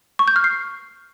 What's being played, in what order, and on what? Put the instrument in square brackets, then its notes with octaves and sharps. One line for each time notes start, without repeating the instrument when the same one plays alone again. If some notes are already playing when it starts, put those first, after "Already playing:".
[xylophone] C#6
G6
F6
C7